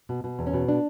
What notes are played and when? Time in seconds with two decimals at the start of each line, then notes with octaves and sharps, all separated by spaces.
0.09 B2
0.24 B2
0.39 E2
0.47 C#4
0.54 B2
0.68 D4